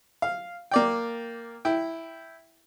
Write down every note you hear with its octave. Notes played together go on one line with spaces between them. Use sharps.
F5
A#3 D5 G5
E4 G5